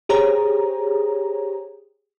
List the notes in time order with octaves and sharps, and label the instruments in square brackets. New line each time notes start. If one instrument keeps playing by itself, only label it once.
[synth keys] G4 G#4 C5 C#5 A#5